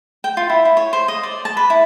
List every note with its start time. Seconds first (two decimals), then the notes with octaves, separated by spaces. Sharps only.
0.24 G5
0.37 F4
0.50 E4
0.65 E4
0.77 C#5
0.93 C5
1.08 D#5
1.23 D5
1.45 A5
1.57 B4
1.70 E4